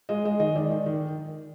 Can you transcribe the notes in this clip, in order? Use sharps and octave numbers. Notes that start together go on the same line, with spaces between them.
G#3 D#5
G#3 D#5
D#3 D#5
D#3 D5
D#3
D#3